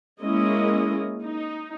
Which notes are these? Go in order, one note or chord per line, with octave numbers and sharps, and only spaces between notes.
G#3 A#3 C#4 E4 D#5
D#4